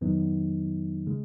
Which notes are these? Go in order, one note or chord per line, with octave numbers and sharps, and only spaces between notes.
F2 D#3 F#3 B3 D#4
C#3 G#3